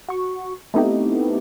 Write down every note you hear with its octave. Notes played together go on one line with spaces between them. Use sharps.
F#4 C#6
A3 B3 C4 D#4 E4 G4